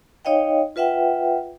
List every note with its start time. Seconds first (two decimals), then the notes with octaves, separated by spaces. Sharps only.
0.25 D#4 C#5 D#5 F5 G5
0.76 F4 B4 E5 F#5 G5